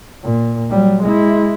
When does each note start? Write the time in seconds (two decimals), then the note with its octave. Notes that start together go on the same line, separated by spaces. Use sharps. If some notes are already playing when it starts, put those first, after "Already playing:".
0.23 A#2
0.70 F#3 G3
1.03 G#3 E4